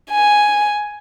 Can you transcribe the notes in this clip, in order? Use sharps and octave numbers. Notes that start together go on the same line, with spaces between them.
G#5